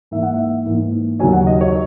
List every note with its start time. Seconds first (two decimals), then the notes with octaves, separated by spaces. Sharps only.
0.11 G#2 E3 A#3 E5
0.23 F#5
0.34 E5
0.66 G#2 E3 A#3
1.20 D#2 C#3 F#3 C#4 G#5
1.33 F#5
1.47 D#5
1.61 C#5